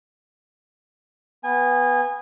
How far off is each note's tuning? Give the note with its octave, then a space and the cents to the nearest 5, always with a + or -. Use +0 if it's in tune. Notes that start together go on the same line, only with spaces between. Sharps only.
B3 +0 G#5 -25